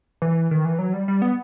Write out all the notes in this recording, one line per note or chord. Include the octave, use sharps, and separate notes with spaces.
E3
D#3
E3
F#3
G3
G3
B3